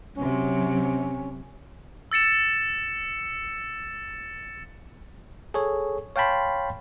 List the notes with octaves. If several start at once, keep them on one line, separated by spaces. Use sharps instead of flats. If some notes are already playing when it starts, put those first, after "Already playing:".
C3 F#3 C#4
E6 A6 C#7 E7
G#4 A4 C#5
C#5 F5 G5 A5 B5 C6